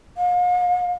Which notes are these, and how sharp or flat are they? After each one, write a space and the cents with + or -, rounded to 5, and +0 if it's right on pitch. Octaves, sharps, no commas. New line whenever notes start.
F5 +40